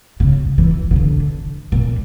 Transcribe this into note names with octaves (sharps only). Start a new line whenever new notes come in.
C#3
E3
C#3
D3
A#2